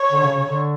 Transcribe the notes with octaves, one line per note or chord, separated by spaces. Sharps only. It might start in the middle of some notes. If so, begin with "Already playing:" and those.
Already playing: C#5
D3
C#3
C#3
D3